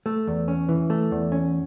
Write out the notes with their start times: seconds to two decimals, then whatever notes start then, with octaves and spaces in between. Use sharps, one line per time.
0.06 A3
0.27 E2
0.48 C#4
0.69 E3
0.90 A3
1.11 E2
1.32 C#4